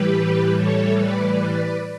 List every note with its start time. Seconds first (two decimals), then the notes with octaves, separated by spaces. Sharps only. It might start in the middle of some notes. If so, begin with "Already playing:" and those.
Already playing: A2 E3 G3 G4 B4
0.56 A4 C#5
0.97 B4 D5
1.38 B4 D5